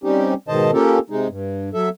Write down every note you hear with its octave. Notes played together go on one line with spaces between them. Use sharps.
G3 C4 C#4 D#4 G4
G#2 B2 D#3 C5 D#5 A5
A#3 C#4 F4 G4 A4 A#4
C3 G#3 D#4
G2
F#3 A4 E5